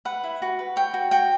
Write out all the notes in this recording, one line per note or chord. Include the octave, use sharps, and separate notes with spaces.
B4 F#5
E4
F#4
B4
C#5 G5
F#4
F#4 G5